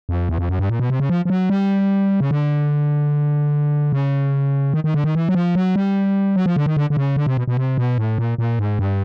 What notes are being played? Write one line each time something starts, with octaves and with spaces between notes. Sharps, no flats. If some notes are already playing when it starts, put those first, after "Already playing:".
F2
E2
F2
F#2
G2
A#2
B2
C3
C#3
F3
F3
F#3
G3
C#3
D3
C#3
D#3
D#3
D3
D#3
E3
F#3
F3
F#3
G3
F#3
F3
D3
D#3
D3
D3
C#3
D3
C3
B2
B2
C3
B2
A2
A#2
A#2
G#2
G2